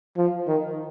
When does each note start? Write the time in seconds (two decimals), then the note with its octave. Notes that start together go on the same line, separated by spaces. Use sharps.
0.17 F3
0.47 D#3